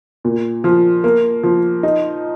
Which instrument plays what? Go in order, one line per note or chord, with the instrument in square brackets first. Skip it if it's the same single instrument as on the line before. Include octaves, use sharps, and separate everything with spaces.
[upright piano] A#2
F3
A#3
F3
D#4